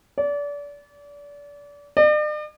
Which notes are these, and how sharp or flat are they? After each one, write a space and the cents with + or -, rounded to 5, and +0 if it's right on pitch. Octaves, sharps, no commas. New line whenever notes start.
D5 -30
D5 +45